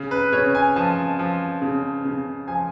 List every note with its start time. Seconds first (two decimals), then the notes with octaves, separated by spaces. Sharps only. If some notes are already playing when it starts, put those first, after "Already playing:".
Already playing: C#3
0.11 B4
0.33 C#3 C#5
0.55 G#5
0.76 F3 A5
1.19 F3
1.62 C#3
2.05 C#3
2.48 F3 G#5